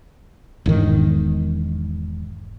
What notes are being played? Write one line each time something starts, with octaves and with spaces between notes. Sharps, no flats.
E1 G#2 D#3